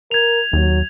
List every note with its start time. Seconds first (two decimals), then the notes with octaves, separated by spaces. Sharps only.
0.11 A#4 G#6 F7
0.53 D#2 F#3